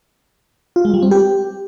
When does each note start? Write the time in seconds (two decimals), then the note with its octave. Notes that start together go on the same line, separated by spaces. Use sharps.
0.76 F4
0.85 G#3
0.94 G3
1.03 C4
1.11 G4